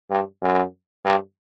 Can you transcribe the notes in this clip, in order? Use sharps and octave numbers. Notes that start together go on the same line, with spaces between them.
G2
F#2
G2